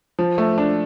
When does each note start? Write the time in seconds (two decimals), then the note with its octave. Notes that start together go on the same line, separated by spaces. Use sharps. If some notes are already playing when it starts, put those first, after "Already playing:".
0.19 F3
0.38 A3
0.58 D4